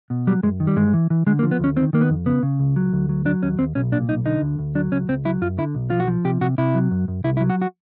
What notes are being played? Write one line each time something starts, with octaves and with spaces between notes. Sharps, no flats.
B2
F#3 G3
F#2 G#3
D#3
G3
G2 G#3
E3
E3
D3 G#3
A#3
F3
B3
D2 C#4
D#3 C4
D#3 A#3
B3
F2
C#3 B3
C#3
C#2
F#3
D2
F#3
F#3 D4
D#2 C#4
D#2 C4
B1 C#4
A#2 D4
B1 D#4
D3 D#4
D2
D2
F#3 D4
C#2 C#4
C#2 C4
F#3 E4
F#2 F4
D3 E4
B1
F3 F4
F#4
F3
C3 G4
C3 F#4
C3 E4
F#3
F#2
F#2
C2 E4
E4
F#3
F#4
F#4